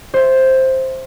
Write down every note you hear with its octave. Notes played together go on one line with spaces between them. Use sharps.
C5 E5